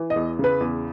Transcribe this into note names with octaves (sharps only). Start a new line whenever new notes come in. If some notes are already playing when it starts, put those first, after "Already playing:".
Already playing: E3
D#5
E2
C#3 B4
E2